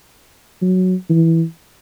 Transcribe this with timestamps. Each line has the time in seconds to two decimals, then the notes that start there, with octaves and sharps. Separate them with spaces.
0.62 F#3
1.10 E3